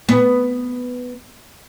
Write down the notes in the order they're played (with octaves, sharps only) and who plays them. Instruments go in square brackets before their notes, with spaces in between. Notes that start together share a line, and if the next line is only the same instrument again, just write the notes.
[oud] B3